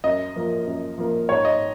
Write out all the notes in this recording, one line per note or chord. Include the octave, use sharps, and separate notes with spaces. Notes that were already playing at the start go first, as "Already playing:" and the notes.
F#2 D#5
F3 A#3
F#2
F3 A#3
G#2 C#5
D#5